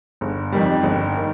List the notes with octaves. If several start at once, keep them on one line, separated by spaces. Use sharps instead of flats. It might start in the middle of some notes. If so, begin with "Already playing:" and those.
G1
F2 D#3 G3
G1
D#3